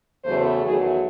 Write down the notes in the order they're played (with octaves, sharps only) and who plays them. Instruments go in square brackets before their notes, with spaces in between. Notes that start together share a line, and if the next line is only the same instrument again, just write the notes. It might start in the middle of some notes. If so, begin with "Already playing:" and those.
[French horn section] E2 C#3 F#3 A3 C5
E2 D#3 F#3 A3 G#4